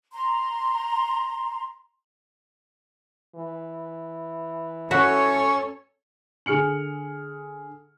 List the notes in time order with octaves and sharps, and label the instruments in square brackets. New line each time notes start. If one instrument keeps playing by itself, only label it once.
[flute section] A#5 C6
[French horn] E3
[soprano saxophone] C#4 [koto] F#4 E5 [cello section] A4 C#5
[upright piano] D3 G#4 F6 C#7 F#7